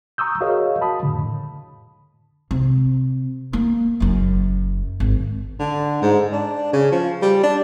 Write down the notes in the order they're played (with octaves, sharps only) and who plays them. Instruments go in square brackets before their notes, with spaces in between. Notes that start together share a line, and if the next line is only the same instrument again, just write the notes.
[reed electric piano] A#5 C#6 D#6 E6 G6
F#4 G#4 A#4 C#5 D#5 F5
A5 B5 D#6
F2 A2 D3
[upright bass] C3
A#3
F#1 F#2
G#1
[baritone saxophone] D3
G#2
D4
C#3
F3
G3
D4